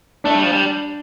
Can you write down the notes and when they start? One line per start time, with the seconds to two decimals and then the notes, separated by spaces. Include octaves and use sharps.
0.24 A3 D4
0.34 G3
0.43 F3
0.52 G3